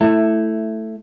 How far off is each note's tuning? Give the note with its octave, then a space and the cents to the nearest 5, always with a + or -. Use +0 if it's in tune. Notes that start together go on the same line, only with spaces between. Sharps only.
A3 +5 E4 +0 A5 +35